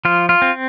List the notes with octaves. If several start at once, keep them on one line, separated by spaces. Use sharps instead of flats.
F3 F4
F4
C4